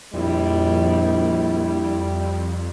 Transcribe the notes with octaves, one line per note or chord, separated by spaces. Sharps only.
A#1 F2 G3 E4